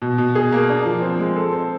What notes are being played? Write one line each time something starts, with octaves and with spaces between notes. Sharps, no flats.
B2
B2
G#4
A#3
D4
F3
C4
G#3
A4
C4